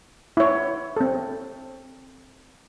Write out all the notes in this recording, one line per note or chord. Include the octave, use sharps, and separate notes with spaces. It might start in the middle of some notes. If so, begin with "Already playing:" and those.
E4 C#5
C4 A4